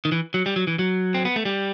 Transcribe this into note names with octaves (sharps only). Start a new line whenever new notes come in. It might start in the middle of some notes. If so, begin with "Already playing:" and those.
D#3
E3
F#3
G3
F#3
E3
F#3
C4
B3
A3
G3